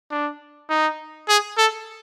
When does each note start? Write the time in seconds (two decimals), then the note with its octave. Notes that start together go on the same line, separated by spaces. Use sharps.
0.11 D4
0.70 D#4
1.29 G#4
1.58 A4